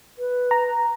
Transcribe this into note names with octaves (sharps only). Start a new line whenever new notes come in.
B4
A#5